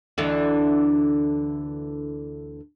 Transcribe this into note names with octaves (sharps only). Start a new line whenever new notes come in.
D2 D3 E3